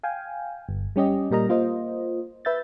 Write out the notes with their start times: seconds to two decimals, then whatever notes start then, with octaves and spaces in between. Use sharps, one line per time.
0.03 F5 G5 G#5
0.69 G1
0.96 G3 C#4 G4 D#5
1.31 A#2 G3 A#4 D#5 A#5
1.49 A#3 F4 C5 D#5
2.45 B4 E5 G6 A6